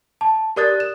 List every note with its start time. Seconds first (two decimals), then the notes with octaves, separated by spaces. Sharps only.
0.21 A5
0.56 G4 A#4 D5 D#6 F#6 A6
0.80 E7